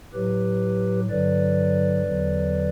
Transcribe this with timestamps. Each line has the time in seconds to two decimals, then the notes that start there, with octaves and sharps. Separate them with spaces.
0.13 A2 F#3 G4 B4
1.10 G2 D3 F#3 B4 D5
2.05 E2 D3 F#3